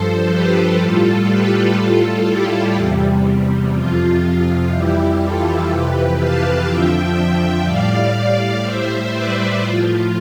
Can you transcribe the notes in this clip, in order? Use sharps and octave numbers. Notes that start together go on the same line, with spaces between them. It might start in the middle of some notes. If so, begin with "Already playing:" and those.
Already playing: G2 F3 A4 C5
G4 B4
A2 G3 F4 A4
G4 B4
A2 G3 F4 A4
E4 G4
E2 C3 G3
F2 C3 F3 F4
F4
F2 E3 G3 E4 G4
F4 A4
F2 C3 E3 G4 B4
F5 A5
F2 D3 F3 E5 G5
A2 G3 D5 F5
A2 G3 C5 E5
B4 D5
A2 F3 F4